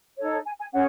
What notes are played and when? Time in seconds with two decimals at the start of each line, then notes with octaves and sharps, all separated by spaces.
0.17 D#4 A4 C#5
0.45 G#5
0.59 G#5
0.73 C#4 G#4 C#5 F#5